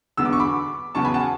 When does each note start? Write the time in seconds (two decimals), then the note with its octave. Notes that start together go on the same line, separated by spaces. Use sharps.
0.17 E2 D3 F#3 B3 E6
0.25 D6
0.33 C#6
0.40 B5 D6
0.95 E2 C#3 F#3 B3 A5 C#6
1.04 G#5 B5
1.14 F#5 A5